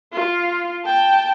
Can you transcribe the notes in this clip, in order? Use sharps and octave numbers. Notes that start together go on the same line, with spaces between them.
F4
G5 A5